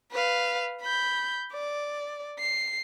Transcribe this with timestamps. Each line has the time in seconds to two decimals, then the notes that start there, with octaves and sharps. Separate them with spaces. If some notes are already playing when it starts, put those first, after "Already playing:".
0.12 B4 F5
0.82 B5 G6
1.52 D5
2.39 C7